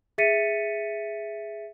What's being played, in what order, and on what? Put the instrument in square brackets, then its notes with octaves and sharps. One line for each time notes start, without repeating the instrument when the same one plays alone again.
[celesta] G#4 E5 A6 B6 C#7 D#7